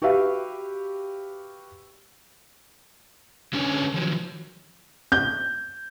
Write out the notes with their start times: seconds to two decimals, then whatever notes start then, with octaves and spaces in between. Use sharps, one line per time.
0.02 F#4 G4 B4 E5 F5
3.53 D3 C#4 D4 B4 C#5 G#5
3.94 D#3 F3 F#3
5.12 G6